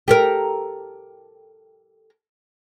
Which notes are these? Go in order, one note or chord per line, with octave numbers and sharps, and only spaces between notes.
G4 A4 A#4